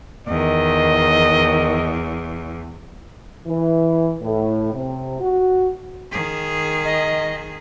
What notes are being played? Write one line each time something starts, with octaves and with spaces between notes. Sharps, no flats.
E2 D#3 D#5
E3
A2
C3
F#4
D#3 G#4
D#5